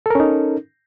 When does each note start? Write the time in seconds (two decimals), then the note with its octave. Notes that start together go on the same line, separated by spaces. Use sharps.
0.06 A4
0.10 A#4
0.15 C#4
0.20 D#4